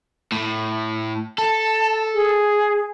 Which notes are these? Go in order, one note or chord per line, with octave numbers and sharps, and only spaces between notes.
A2
A4 A5
G#4